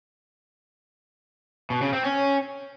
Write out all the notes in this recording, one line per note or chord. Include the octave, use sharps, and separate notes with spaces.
B2
C#3
C4
C#4